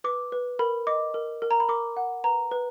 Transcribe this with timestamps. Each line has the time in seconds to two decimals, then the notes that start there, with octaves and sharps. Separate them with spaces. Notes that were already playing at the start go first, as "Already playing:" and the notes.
0.04 B4 D6
0.32 B4
0.59 A#4 B5
0.87 D#5 D6
1.14 A#4
1.42 A#4
1.51 A#5
1.60 B5
1.69 A#4 D6
1.97 F#5
2.24 B4 A#5
2.51 B4